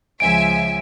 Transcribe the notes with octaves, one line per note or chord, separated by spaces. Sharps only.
C#2 F3 E5 G#5 D7